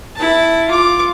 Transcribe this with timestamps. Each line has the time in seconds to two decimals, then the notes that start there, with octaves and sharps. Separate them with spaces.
0.16 E4 A5
0.68 F4 D6